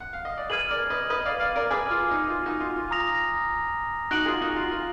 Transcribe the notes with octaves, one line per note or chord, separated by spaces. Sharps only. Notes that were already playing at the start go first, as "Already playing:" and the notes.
F#5
F5
D#5
D5
G#4 B4 F6 G#6 D#7 F#7
A#4 D5
B4 D#5
B4 D#5
D5 F5
D5 F5
A#4 D5
G#4 B4 G#5 D6 F6
F4
D#4
F4
D#4 F#4
F4
F4
A#5 D#6 A#6 F7
D#4 F#4 F#6 D7 F#7
F4 G#4
D#4 F#4
F4
F4